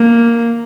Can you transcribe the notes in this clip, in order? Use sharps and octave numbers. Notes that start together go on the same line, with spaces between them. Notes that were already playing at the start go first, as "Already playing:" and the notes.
Already playing: A#3